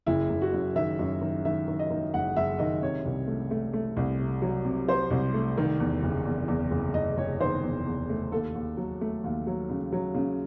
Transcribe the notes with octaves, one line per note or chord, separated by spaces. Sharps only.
F#1 E4
F#1
F#4
F#2
D#3 E5
F#2
D#3
D#3 E5
D#3
D#5
D#3
F#1 F#5
F#1 E5
D#3 D#5
C3 C#5
C2
A3
A3
A3
C2
C3
F#3
C3
F#3 C5
C2
A3
D#3
E2
F#1
E2
E2
F#1
F#1 D#5
F#1 C#5
D#3 C5
E2
E2
A3
D#2 A4
D#2
F#3
A3
D#2
F#3
C#3
F#3
C#3